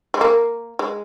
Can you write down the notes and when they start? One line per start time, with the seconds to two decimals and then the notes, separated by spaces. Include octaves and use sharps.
0.14 G#3
0.21 A#3
0.79 G#3